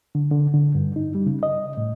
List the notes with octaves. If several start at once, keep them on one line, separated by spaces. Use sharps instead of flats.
D3
D3
D3
G2
D#4
G3
C#3
D#5
A2